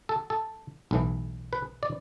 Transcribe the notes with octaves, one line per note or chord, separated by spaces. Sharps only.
A4
A4
B1 A2 E3
B4
D5